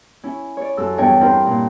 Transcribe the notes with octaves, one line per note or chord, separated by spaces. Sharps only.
C#4 E4
C#5 D5
F#2 A4 E6
E2 G2 D4 C#5 D#5 G5
C4 D4 E4 F4 A#4 C5
A#2